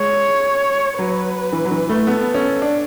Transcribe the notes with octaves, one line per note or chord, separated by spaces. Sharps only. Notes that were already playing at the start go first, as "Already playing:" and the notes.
Already playing: G#3 C#5
F#3 B4
E3
F#3
E3
A3
B3 A4
C#4
D4